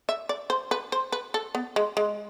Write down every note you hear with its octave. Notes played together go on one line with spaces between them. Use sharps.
E5
D5
C5
B4
C5
B4
A4
B3
G#3
G#3